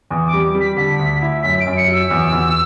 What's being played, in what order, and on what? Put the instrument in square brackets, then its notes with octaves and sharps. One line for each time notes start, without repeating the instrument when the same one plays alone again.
[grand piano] E2
[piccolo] D6
[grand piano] G3
G3
[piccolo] B6
[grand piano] D3 [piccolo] B6
[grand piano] D2
E4
[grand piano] F#2 [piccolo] B6
[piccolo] D7
[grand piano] F#2
[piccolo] C#7
[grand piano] F#3
[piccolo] E6
[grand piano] E2
E2